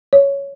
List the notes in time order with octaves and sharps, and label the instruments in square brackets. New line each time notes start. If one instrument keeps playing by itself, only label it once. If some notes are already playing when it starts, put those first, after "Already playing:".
[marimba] C#5